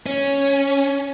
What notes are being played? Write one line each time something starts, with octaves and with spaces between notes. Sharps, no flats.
C#4 C#5